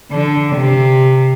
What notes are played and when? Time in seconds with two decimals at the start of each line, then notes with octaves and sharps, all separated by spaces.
0.11 D3
0.56 C3